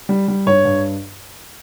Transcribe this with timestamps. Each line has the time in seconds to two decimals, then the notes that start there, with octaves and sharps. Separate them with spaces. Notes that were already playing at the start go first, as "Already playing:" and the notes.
0.09 G3
0.28 G3
0.46 G2 C#5
0.65 G2